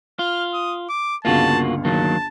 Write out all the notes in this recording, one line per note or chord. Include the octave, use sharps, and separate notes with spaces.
F4 F6
D#6
D6
G1 C#2 A#3 F4 F#4 F5 A5
D#3 F#3 A#3 A5